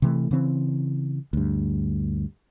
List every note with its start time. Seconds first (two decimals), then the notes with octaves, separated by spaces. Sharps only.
0.02 C3 E3 A3
0.31 C#3 E3 C4
1.33 D2 G2